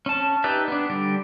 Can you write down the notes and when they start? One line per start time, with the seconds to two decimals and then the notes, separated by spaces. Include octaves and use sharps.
0.06 C#4 A5
0.44 D#4 G4 B4 D5 E5
0.68 B3 D4
0.90 D3 G3 D5